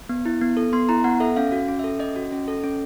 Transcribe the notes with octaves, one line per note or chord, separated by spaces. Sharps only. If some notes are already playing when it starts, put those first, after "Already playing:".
B3
E4
B3
A4
B3 C6
E4 A#5
B3 F#5
A4 E5
C#4 F5
F#4
C#4
A4 E5
C#4 D#5
F#4
C#4
A4
C#4